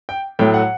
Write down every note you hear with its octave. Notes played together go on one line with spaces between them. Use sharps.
G5
A2 F#3 A3 G5
F#5